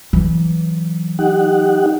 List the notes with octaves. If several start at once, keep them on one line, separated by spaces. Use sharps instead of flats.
E3 F#3
D#4 G4 F#5